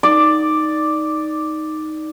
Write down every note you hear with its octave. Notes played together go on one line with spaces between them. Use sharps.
D#4 D5